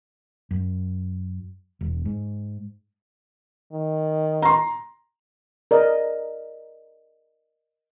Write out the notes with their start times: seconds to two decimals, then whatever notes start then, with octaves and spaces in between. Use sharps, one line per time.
0.51 F#2
1.81 E1
2.05 G#2
3.72 D#3
4.42 A#5 C6
5.71 A#4 D5 D#5